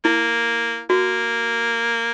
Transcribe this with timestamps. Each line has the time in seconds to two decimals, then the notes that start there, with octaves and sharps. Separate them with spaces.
0.04 A#3 E4
0.90 A#3 F#4